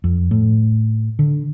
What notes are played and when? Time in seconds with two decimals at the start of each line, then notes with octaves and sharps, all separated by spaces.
0.04 F2
0.31 A2
1.19 D3